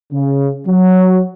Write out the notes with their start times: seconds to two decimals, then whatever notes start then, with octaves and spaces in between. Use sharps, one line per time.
0.12 C#3
0.67 F#3